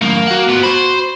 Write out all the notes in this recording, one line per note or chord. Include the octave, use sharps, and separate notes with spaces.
F#2 A2 D#3 A#3
F#4 F#5
B3 F4
F#4 C5 B5